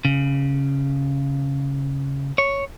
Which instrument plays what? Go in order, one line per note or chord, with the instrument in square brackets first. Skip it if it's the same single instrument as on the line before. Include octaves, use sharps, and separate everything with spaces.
[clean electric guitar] C#3
C#5